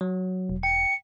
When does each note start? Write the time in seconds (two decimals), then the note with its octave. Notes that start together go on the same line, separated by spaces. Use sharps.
0.01 F#3
0.49 E1
0.63 G5 C#7